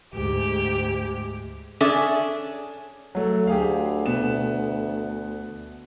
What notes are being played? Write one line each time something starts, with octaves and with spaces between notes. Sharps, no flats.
D2 G#2 G4
C#4 D4 G#4 A4 E5
F#3 A3
D2 G4 G#4 F5
B2 B3 E7